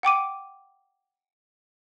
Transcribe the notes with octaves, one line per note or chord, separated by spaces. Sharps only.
F#5 G5 D6 D#7